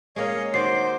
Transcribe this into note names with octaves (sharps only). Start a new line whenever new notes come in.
G#3 A#3 C#4 C#5 D#5
D#3 F#4 C5 D5 D6 C7